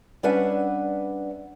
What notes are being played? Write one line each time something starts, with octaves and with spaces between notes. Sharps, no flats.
G3 C#4 D4 B4 E5 F#5